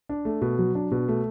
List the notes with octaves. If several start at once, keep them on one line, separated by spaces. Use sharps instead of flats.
D4
A3
B2
F#3
D4
B2
A3